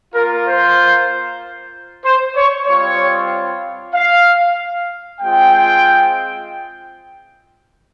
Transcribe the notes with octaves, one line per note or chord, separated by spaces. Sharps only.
A#3 F4 A#4
C5
C5
C#5
G3 C4 F4 C#5
F5
G#3 C4 F4 G5